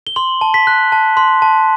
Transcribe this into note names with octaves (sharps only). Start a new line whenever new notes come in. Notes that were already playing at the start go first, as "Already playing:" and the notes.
G7
C6 F#7
A5
B6
F#6
A5
C6
A5